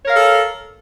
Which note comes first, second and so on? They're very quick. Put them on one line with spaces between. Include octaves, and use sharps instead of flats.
C#5 A#4 F5 A4